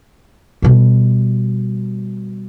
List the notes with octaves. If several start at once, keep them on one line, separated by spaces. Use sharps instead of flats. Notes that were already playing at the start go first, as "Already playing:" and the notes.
B2 G3